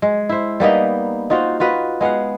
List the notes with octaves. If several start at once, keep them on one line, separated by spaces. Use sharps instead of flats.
G#3
E4 C5
G3 A#3 B3 D#4
D#4 F4 F#4 C5
F4 F#4 B4 D#5
G#3 B3 F5 F#5